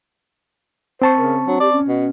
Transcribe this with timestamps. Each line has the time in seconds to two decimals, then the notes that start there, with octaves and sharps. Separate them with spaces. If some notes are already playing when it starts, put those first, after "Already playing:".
1.02 C4 C5 A5 C#6
1.18 C#3 A#4
1.46 F#3 D4
1.60 G4 D5
1.72 C#4
1.88 B2